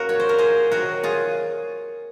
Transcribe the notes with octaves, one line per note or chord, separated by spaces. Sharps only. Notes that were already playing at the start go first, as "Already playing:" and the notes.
Already playing: C#3 A#3 F#4 A#4
A#2 F#3 C#5
C5
A#4
G#4 C5
C3 D#3 F#3 F#4 A#4
F4 G#4